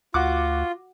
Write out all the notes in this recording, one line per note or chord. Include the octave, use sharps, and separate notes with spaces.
D2 F4 F#4 F#5 D6